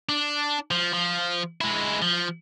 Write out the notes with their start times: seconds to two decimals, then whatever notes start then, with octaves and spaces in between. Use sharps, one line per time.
0.09 D4
0.71 F3
0.93 F3
1.61 G#3 E4
2.02 F3